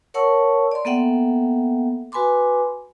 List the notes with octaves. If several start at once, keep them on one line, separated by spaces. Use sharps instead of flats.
A#4 C#5 F#5 A5 C#6 E6
D5 C6
A#3 B3 A4 E5 F#5 G5
F#4 B4 G#5 B5 C6 D6